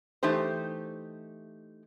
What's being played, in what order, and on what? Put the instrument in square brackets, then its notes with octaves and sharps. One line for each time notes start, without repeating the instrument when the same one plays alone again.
[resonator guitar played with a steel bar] E3 A3 D#4 G4 C5